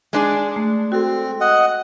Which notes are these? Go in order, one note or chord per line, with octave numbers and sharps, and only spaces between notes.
G#3 D4 G#4
A3
C4 F#4 A4
D#5 F#5